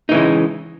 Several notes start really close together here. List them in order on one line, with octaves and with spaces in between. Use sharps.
D#4 E3 C#3 G#3